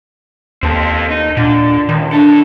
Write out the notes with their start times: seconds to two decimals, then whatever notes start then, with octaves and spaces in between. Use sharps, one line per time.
0.63 D#2 C4 A4
1.10 D#4
1.37 A#2 D3
1.89 C#2 D#3
2.13 D4 E4 A4